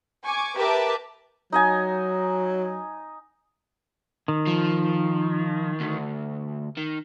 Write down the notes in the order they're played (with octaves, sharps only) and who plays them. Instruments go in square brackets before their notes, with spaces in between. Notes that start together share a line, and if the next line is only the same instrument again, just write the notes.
[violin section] G#5 C#6 D6 G#6
G4 A#4 B4 E5 A5 D6
[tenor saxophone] F#3 [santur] D#4 D#5 G#5
[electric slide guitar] D#3
[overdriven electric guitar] F3
D2
D#3